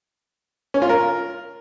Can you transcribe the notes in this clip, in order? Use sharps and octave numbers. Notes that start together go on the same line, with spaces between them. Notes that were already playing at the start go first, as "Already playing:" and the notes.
C#4
F4
A#4